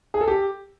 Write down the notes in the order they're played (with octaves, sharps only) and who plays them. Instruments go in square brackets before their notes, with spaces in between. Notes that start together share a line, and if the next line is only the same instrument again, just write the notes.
[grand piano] G#4
A4
G4